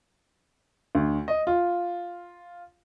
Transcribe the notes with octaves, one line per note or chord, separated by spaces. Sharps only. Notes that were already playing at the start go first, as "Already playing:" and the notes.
D2
D#5
F4